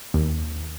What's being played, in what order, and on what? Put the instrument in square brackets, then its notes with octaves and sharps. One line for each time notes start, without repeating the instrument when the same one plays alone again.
[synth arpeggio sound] D#2